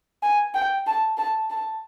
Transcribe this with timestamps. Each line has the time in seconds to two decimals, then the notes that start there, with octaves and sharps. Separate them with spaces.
0.23 G#5
0.55 G5
0.87 A5
1.18 A5
1.50 A5